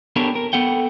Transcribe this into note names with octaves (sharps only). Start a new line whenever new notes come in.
B3 D4 G4 A4 A#4 C#5
A#4
B3 A4 F#5 G5